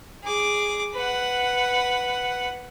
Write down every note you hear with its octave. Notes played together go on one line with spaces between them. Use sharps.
G#4 D6
B4 F#5